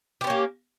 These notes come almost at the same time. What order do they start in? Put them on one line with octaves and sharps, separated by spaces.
G4 B3 C#4 A#3